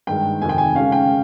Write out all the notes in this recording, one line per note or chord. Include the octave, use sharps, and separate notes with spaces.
G2 D#3 G#3 G5
F2 C3 D#3 G#5
G5
G#5
C#3 G#3 C#4 F5
G5